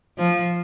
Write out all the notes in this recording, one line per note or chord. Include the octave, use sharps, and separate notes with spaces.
F3